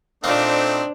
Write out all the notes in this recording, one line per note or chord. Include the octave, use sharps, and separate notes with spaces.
A#2 A3 A#3 C4 D4 D#4 C5